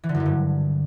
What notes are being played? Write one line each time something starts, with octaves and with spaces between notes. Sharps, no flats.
E3
D3
F#2
D3
G2